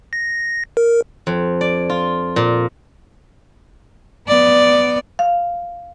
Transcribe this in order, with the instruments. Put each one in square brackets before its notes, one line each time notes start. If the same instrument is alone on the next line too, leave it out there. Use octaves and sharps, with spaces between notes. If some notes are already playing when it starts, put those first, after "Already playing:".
[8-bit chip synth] A#6
A#4
[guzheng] F2
D5
F4
A#2
[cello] B3 D5
[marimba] F5